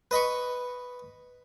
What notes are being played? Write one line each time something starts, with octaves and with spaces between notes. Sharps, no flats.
B4 D#5 B5 C#6